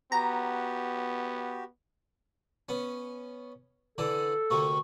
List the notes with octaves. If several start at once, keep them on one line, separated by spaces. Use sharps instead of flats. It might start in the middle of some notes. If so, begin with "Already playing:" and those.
B3 F#4 G4 A#5
B3 C#4
D3 E3 D4 A4
D2 C3 A#3 C#6